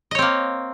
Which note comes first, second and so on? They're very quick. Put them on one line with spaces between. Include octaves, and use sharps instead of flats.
D#5 C#5 C4 A#3